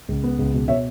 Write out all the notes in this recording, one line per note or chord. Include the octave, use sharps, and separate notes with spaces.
C#2
B3
C#2
B2
B2 C#5 E5